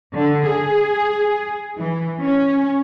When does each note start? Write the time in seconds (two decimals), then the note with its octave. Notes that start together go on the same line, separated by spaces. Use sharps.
0.16 D3
0.47 G#4
1.77 E3
2.22 C#4